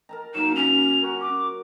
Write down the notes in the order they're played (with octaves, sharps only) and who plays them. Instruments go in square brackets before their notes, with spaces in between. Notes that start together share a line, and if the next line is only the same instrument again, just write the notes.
[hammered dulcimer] A#4 A5 A#5
[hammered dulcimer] F#3 A#3 [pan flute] D#4 [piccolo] E7
[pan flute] C#4 [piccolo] F7
[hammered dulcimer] F#4 A#4
[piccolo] D6